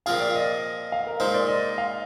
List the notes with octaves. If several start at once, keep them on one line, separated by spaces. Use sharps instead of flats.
A#2 F3 C4 F4 G#4 F5
D5
D#5
F5
A#4
A#2 G#3 D#4 C5
D5
D#5
F5